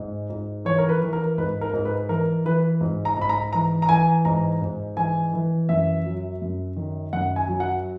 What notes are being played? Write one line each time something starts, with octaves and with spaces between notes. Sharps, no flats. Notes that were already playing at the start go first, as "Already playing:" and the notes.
Already playing: G#2
G#2
E3 C#5
A#4
B4
E3
A#4
G#2 B4
A#4
G#2
B4
E3 A#4
E3 B4
G#2
A#5
G#2 B5
A#5
E3 A#5
A#5
E3 G#5
G#2 A#5
G#2
E3 G#5
E3
F#2 E5
F#3
F#2
D#3
F#2 F#5
G#5
F#3
F#5